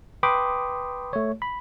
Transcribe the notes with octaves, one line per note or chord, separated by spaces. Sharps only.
B4 G5 B5 C6 D6 D#6
A3 C#5
B5